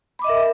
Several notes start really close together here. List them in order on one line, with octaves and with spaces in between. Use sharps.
B5 D6 D#5 E5 A#4